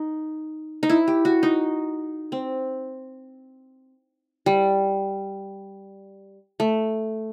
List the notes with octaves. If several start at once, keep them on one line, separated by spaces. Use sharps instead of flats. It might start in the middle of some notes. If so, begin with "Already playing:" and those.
Already playing: D#4
D#4
E4
G4
F#4
D#4
C4
G3
A3